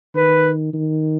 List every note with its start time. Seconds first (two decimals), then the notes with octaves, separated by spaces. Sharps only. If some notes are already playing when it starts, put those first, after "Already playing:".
0.15 D#3 B4
0.73 D#3